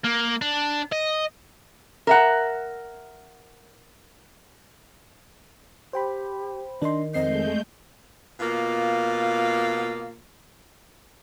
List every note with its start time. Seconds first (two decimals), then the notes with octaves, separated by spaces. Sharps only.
0.04 A#3
0.42 D4
0.92 D#5
2.07 A#4 E5 F#5
5.93 G4 C5 G5 B5
6.82 D#3 D4 D#5 C6
7.14 F2 G#3 A3 C4 D#5 G6 C7
8.40 B2 A#3 F4